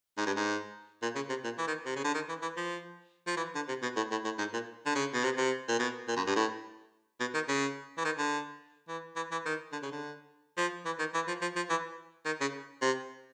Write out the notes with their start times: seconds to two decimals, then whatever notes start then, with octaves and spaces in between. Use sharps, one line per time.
0.17 G#2
0.26 G2
0.36 G#2
1.02 A#2
1.15 C#3
1.29 C3
1.44 A#2
1.58 E3
1.67 D#3
1.86 C3
1.96 C#3
2.04 D3
2.14 D#3
2.29 E3
2.42 E3
2.57 F3
3.27 F3
3.36 E3
3.55 D3
3.68 C3
3.82 B2
3.96 A2
4.11 A2
4.24 A2
4.38 G#2
4.53 A#2
4.86 D3
4.95 C#3
5.14 B2
5.24 C3
5.38 C3
5.68 A#2
5.79 B2
6.08 A#2
6.16 F#2
6.27 G2
6.36 A2
7.20 B2
7.34 D#3
7.48 C#3
7.98 E3
8.04 D#3
8.18 D3
8.88 E3
9.16 E3
9.31 E3
9.45 D#3
9.72 D3
9.82 C#3
9.92 D3
10.57 F3
10.85 E3
10.99 D#3
11.14 E3
11.27 F3
11.41 F3
11.56 F3
11.70 E3
12.25 D#3
12.41 C#3
12.82 C3